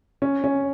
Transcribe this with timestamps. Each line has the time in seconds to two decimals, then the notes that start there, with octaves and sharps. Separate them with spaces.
0.22 C#4
0.44 C#4